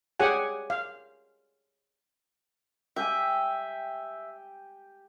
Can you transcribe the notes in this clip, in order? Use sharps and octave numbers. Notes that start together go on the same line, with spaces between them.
G4 G#4 C#5 F#5 G#5
F5
G4 E5 G5 G#5